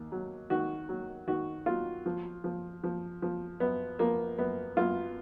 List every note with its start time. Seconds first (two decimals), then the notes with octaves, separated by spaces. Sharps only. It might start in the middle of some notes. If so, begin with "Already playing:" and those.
Already playing: D#2
0.12 F#3
0.50 D#3 F#4
0.89 F#3
1.27 D#3 F#4
1.66 F#3 F4
2.06 F3
2.44 F3
2.84 F3
3.22 F3
3.60 F#2 B3
3.99 F3 A#3
4.38 F#2 B3
4.77 F#2 F4